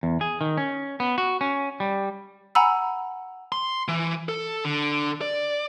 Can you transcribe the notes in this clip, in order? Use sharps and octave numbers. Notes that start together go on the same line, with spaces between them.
E2
G#4
D#3
C#4
B3
F#4
C#4
G3
F#5 G#5 A#5 B5 E6
C6
E3
A4
D3
D5